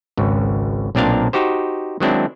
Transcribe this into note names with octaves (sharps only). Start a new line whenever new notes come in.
G#1 C#2
B1 A#2 C4 D4 A#4 F5
D#4 F#4 G4 C5
D#3 F#3 G#3 C4 D4 E4